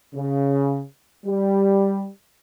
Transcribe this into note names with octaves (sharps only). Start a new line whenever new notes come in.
C#3
G3